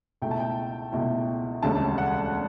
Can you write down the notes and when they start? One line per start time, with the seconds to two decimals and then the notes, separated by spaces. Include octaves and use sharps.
0.22 C#2 B2 A3 E4 G5
0.31 A5
0.40 G5
0.92 C#2 B2 A3 E4
1.63 E1 D2 C#3 G3 D4 A5
1.98 F#5